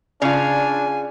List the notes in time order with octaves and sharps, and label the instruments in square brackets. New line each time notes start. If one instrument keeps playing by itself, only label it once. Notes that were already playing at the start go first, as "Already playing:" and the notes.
[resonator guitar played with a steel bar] C#3 F4 [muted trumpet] D4 [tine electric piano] D5 [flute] G#5